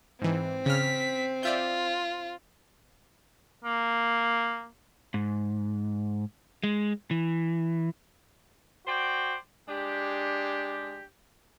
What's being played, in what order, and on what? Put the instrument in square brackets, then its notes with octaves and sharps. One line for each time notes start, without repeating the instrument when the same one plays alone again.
[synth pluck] G#2 E3 [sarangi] C4
[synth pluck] C#3 F6 [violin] B6
[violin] F4 [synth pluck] D5 E5 G6
[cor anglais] A#3
[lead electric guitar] G#2
G#3
E3
[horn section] F#4 C5 D5 G5
G#3 D4 G4